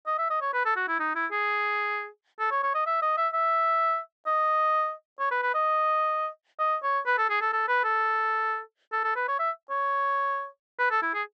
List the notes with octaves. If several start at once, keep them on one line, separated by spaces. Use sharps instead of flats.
D#5
E5
D#5
C#5
B4
A4
F#4
E4
D#4
E4
G#4
A4
C#5
C#5
D#5
E5
D#5
E5
E5
D#5
C#5
B4
B4
D#5
D#5
C#5
B4
A4
G#4
A4
A4
B4
A4
A4
A4
B4
C#5
E5
C#5
B4
A4
E4
G#4